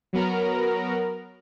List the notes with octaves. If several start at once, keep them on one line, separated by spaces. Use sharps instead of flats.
F#3 B3 A#4 A#5